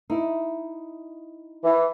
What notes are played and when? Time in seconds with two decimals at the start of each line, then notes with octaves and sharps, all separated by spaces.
0.10 D#4 E4
1.63 E3